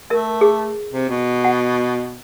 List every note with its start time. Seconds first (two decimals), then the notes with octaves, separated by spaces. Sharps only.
0.10 A3 A#4 E5
0.41 G#4
0.92 C3
1.09 B2
1.44 F#5